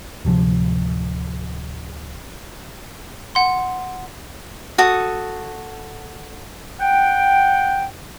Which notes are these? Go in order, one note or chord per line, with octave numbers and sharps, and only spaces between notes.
D1 C3 F3
F#5 C6
F#4 A4 D#6
F#5 G5